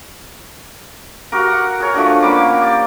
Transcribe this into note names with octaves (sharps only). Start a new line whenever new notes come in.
F#4 G4 A#4
F#5
G#4 A#4 C#5
F3 A3 D4 F#4
A#3 C#4 B5 D6
G4 D5